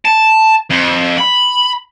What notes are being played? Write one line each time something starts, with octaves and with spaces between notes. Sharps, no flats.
A5
F2
B5